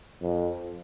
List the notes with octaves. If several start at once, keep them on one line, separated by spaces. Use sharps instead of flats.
F2